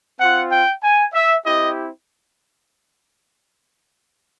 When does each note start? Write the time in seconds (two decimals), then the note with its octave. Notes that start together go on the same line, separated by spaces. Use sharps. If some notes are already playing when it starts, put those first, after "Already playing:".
0.20 C4 F4 F#5
0.51 G5
0.83 G#5
1.14 E5
1.45 C4 E4 G4 D#5